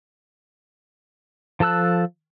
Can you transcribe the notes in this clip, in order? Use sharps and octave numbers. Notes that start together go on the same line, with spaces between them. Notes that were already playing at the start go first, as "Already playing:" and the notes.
F3 A4 A5 E6 F#6